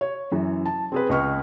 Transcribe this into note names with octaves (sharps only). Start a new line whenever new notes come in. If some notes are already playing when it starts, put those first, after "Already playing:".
C#5
F#2 E3
A5
C4 G#4 B4
C#2 D#5 C#6 F6